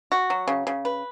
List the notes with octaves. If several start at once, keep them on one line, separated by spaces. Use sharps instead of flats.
F#4
F#3
C#3
C#3
B4